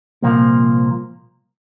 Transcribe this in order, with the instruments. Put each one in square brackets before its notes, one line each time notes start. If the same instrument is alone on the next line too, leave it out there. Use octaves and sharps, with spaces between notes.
[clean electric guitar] C2 A#2 F3 A#3